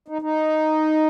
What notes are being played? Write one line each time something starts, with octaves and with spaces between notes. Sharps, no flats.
D#4
D#4